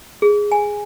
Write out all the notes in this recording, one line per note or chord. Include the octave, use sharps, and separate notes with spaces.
G#4
G#5